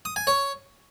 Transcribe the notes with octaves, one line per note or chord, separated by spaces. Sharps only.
D#6
G#5
C#5